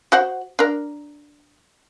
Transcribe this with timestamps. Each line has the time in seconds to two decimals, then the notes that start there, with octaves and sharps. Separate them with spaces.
0.12 F#4 C5 F#5
0.59 D4 A#4